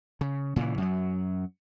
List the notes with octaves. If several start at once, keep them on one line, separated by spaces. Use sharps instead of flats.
C#3
A#2 C#3 E3
F#2 F#3